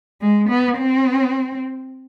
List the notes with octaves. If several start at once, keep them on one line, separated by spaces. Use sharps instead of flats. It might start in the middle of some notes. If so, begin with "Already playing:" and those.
G#3
B3
C4